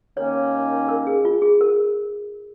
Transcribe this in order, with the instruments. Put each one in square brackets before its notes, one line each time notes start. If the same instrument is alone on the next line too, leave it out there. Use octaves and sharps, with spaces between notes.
[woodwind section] D#2 D#3 A#3 C#4 [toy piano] C#5
[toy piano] A#4
G#4
F4
G#4
A#4